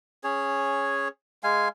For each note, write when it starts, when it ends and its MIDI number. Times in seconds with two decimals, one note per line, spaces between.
0.24 1.08 61
0.24 1.08 68
0.24 1.08 73
1.43 1.68 56
1.43 1.68 77
1.43 1.68 80